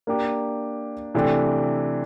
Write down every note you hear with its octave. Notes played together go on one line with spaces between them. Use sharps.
A#3 D4 G4
C3 E3 A3 D4 G4